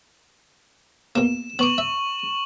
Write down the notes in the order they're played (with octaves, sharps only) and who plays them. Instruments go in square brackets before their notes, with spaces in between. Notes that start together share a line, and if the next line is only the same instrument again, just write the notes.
[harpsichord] B2 A#3 [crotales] E7
[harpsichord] B3 D6 [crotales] C#6 F#7
[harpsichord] E5